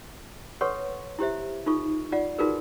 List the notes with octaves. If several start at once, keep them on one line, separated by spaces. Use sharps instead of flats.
A4 B4 C#5 F#5 C6 C#6
E4 G4 C5 E5
D#4 F4 A4 C#6
F4 D5 F#5
D#4 F4 F#4 G#4 A#4 B4